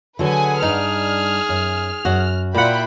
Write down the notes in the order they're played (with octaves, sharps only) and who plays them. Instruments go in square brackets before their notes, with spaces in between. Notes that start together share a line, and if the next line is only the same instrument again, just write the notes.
[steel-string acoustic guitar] D3 F#3 A4 [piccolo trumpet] G#4 [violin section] B4 F#5 G#5
[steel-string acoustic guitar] G2 D4 [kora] D#4 [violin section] F6
[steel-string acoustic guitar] F#2
[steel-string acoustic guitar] F#2 [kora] F#4
[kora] A#2 F#5 [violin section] E4 F4 B5 [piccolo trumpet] G5